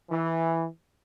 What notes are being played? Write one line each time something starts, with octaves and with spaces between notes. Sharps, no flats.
E3